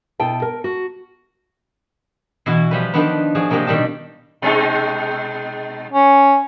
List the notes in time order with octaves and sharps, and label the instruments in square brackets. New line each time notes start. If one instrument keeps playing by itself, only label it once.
[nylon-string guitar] B2 E4 G5 A5
A#4
F#4
[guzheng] B2 E3 E4 F#4
F3 G3 B4
D#3 F3 B3 D4 B4
F3 D4 F#4 G#4
C3 A#3 D4 G4 D#5
B2 D#3 G3 G4 A5
[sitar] B2 G#3 D#4
[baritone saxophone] C#4